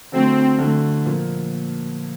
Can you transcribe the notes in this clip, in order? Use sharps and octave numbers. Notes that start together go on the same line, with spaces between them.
D3 F#3 A3 C4
D3 F#3 A3
A#2 F3 A#3